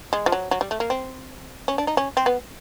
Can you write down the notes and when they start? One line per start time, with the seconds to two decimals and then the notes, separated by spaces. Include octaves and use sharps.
0.13 G#3
0.26 F3
0.32 F#3
0.51 F#3
0.61 G3
0.71 A3
0.80 A#3
0.90 C4
1.68 C#4
1.78 D4
1.87 D#4
1.97 C#4
2.17 C4
2.26 B3